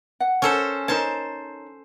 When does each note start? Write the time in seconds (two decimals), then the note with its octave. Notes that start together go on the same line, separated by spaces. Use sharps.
0.20 F#5
0.42 C#4 A4 C5
0.88 D#4 A#4 C5 C#5 A5